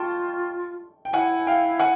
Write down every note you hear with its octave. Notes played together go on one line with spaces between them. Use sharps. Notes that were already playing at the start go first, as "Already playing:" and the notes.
Already playing: F4 G5 A5 C#6
G5
E4 F#5 G#5
F5 G5
F#5 G#5